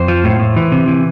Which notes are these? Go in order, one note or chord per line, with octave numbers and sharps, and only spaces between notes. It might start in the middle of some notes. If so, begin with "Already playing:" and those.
Already playing: F2 C5
F3
A2
A2
E3
C3
E3